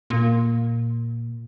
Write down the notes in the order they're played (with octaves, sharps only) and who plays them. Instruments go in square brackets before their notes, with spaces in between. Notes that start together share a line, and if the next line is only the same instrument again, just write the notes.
[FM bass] A#2